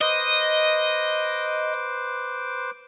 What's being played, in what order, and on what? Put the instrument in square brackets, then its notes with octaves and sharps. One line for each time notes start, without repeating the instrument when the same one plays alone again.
[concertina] B4 C5 D6 [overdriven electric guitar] D#5